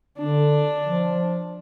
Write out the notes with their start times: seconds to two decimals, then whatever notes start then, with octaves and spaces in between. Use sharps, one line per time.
0.18 D3 D4
0.86 F3